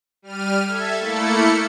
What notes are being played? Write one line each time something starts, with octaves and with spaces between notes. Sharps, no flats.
G3 F6 D#7
A4 E5 G#6
A3 A#3 E4 A4 C#7